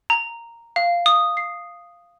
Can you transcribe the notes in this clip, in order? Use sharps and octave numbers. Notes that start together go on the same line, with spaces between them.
A#5
F5
D#6
C7